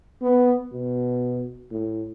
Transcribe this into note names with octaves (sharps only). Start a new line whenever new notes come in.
B3
B2
A2